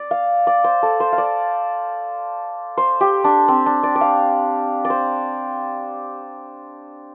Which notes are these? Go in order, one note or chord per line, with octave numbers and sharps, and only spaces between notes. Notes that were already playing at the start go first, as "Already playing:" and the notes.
Already playing: D5
F5
D5
C5
A4
C5
F5
D5
C5
G4
D4
C4
D4
D5
D5
F5
D5
C5